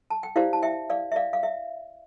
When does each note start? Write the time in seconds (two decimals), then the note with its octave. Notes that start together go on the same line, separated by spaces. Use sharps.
0.10 A5
0.23 G5
0.36 E4 G4 C5 D5 F5
0.53 A5
0.63 E5 G5
0.90 D5 F5
1.12 E5
1.16 D5 F5
1.33 F5
1.43 E5